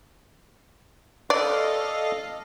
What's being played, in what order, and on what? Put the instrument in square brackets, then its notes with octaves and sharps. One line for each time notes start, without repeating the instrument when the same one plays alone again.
[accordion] A4 D#5 F5 [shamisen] D5